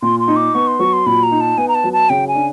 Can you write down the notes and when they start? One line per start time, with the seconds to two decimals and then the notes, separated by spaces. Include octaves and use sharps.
0.02 A#2 C6
0.20 C6
0.28 D#4
0.36 D6
0.54 B3 C#6
0.67 C6
0.79 F#3 C#6
0.93 C6
1.06 A#2 B5
1.23 A#5
1.31 D#4
1.40 A5
1.57 B3 G#5
1.68 A#5
1.75 A5
1.84 F#3
1.93 A5
2.09 C#3 G5
2.28 G#5
2.35 D4